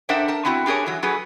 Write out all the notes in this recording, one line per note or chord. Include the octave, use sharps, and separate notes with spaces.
D4 A#4 C5 E5 F#5 G5
A#4 A5
B3 C4 E4 F#4
D4 G4 G#4 A#4 C#5
E3 F#3
F#3 F#4 G#4 B4